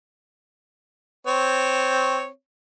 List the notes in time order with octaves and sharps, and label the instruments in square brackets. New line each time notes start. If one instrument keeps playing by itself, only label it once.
[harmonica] C4 C#5